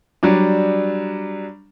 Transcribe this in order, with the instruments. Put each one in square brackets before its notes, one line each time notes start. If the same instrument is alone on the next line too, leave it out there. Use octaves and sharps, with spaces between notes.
[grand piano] F#3 G3 D4